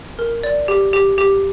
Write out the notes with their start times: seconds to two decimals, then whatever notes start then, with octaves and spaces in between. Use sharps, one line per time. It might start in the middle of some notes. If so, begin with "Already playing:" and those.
0.19 A#4
0.43 D5
0.68 G4
0.93 G4
1.18 G4